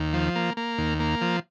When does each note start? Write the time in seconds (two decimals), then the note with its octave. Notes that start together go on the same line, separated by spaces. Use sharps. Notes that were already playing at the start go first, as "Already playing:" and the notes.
Already playing: D#2
0.13 F3
0.36 A#3
0.57 A#3
0.78 D#2
1.00 A#3
1.21 F3